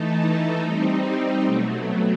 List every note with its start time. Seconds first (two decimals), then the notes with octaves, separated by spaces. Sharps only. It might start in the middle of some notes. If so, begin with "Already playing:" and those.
Already playing: E3 A3 D#4 A4
0.61 G3 C4 D#4
1.43 B2 F#3 A3